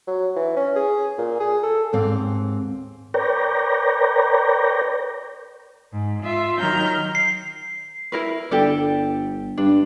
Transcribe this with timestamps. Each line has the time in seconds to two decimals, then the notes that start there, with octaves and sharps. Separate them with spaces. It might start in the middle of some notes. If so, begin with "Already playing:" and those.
0.07 F#3
0.36 E3
0.56 C#4
0.75 G#4
1.18 A#2
1.40 G#4
1.63 A4
1.93 D#2 G#2 C4 F5
3.14 A#4 B4 C#5 D5 G5 A#5
5.93 G#2
6.23 F4 E5
6.59 D#3 F#3 A#5 F6 G6
7.15 C7
8.12 E4 A#4 B4
8.51 G1 G4 A4 D5
9.58 G2 D4